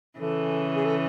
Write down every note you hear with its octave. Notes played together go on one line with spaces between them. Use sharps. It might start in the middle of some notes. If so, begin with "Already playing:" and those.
C#3 E3 A4
G#4
A4